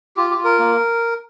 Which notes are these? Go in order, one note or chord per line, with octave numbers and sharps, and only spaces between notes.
F4 G4
G4
F4
A#4
A#3